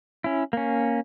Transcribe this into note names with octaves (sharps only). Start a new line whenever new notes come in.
C#4 E4
A#3 C#4